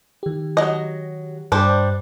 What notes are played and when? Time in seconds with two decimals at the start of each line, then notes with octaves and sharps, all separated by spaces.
0.23 D#3 G4
0.57 F#3 D#5
1.52 G2 G3 D4 C5